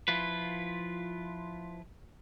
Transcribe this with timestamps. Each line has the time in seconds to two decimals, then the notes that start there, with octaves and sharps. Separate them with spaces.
0.08 F3 E4 F4 B4